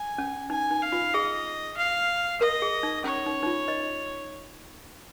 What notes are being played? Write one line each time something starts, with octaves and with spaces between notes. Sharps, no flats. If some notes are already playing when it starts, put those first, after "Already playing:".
Already playing: G#5
C#4
D#4 G#5
D#4
F5
F4
G#4 D#5
F5
A#4 D#5
G#4
D#4
C#4 C#5
D#4
D#4
F4
D#5